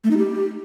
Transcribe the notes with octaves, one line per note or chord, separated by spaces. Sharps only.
A3
D#4
G4